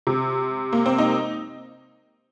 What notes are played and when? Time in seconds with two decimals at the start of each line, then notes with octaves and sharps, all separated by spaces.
0.07 C3
0.73 A#3
0.86 C4
0.98 D#4